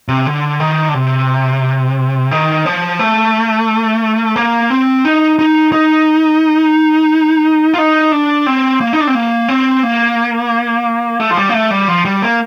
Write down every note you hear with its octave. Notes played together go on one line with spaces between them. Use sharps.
C3
D3
D#3
D3
C3
D#3
F3
A3
A#3
C4
D#4
D#4
D#4
F4
D#4
D4
C4
A#3
D#4
D4
C4
A#3
C4
A#3
A3
F3
G3
A#3
A3
G3
F3
G3
A#3